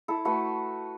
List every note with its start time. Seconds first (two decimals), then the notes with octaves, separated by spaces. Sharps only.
0.08 E4 A4
0.25 A3 F#4 B4